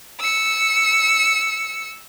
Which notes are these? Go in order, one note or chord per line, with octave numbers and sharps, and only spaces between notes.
E6 C#7